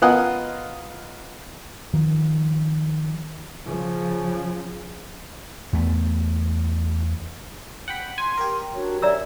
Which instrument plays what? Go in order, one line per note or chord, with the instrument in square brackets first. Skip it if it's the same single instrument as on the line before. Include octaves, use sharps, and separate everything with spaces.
[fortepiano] B3 F4 A#4 D#5 F#5 G#5
[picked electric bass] D#3 F3
[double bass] C#3 F3
[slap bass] E2 A3 B3
[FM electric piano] F#5 G5 B5
[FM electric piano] G#5 [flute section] C6
[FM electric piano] G4 A#4
[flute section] D4 F#4 C#5
[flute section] C#4 C#5 E5 [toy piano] D5 A#5 E6